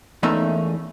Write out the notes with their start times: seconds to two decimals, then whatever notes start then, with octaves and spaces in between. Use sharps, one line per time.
0.23 E2 A3 A#3 C#4 D#4 E5